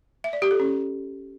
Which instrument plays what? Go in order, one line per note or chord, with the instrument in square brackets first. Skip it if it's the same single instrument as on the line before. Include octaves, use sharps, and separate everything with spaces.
[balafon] E5
D5
G4
A4
C#4